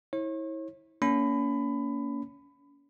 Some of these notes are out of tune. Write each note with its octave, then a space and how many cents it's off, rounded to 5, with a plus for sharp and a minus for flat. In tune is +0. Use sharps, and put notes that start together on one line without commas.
E4 -30 C#5 -40
A#3 +0 C#4 +35 B5 +20